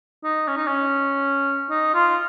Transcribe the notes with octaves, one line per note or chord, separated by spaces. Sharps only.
D#4
C#4
D#4
C#4
D#4
F4